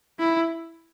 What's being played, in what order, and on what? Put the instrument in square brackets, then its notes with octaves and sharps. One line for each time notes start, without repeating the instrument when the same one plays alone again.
[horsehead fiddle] E4